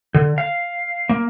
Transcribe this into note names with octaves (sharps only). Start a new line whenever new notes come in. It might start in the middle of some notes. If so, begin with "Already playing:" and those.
D3
F5
A#3